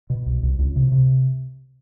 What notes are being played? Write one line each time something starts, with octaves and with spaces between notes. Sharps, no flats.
B2
C2
C2
C#2
C3
C3